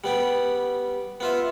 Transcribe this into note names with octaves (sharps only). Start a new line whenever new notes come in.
G3 B3 G4
B3 F4 E5